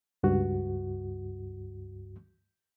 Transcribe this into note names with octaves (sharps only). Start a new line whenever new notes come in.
C#2 G2 F#4